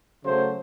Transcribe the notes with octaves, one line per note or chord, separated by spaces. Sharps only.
C#3 F#3 A3 C5